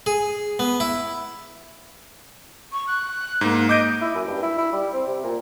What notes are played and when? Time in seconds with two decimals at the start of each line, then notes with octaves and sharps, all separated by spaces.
0.06 G#4
0.59 B3
0.80 E4
2.73 C#6
2.88 F#6
3.41 G#2 A#3
3.69 D#5 D6 G6 D7
4.01 E4
4.15 F#2
4.28 G2
4.43 E4
4.58 E4
4.73 G3
4.93 C4
5.07 C3
5.24 A#2